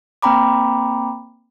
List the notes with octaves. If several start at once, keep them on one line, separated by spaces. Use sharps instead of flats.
A#3 C4 G5 A#5 B5 D6